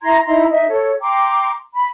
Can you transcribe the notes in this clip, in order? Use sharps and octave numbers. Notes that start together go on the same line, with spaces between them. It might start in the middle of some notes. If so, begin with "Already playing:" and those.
E4 A#5 C6 G#6
D#4 E4 A#5 C6
D#4 D#5 E5
A4 C#5
G5 A#5 C6 D6
B5